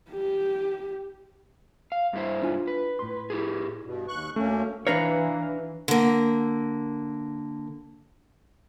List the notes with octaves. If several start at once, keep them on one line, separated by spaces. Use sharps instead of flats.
G4
F5
G2 E4 C5
D4 F4 G#5
B4
A2 C6
E4 G4 G#4
G2 B2
D#2 C#6 F#6
D2 A3 A#3 C#4
E3 D4 B4 C#5 F5 A#5
D3 A#3